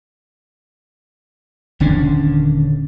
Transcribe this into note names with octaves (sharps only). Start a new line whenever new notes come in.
D#1 D3 C#4 D4